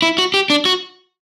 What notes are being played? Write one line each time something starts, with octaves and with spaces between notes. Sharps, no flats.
E4
F#4
G4
D4
F#4